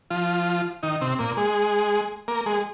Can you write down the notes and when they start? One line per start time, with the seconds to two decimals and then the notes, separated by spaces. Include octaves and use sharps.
0.10 F3 F4
0.83 D#3 D#4
1.01 C3 C4
1.19 A#2 A#3
1.37 G#3 G#4
2.28 A#3 A#4
2.46 G#3 G#4